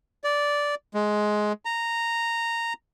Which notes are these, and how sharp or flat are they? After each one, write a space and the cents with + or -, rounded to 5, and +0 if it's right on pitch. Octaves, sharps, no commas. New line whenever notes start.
D5 -10
G#3 +15
A#5 -10